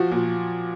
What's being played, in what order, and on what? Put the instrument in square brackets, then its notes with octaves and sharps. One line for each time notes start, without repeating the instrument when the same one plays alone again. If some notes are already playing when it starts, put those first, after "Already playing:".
Already playing: [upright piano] F3 F#4
A#2